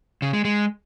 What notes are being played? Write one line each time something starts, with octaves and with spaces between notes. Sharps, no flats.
C#3
G#3
G#3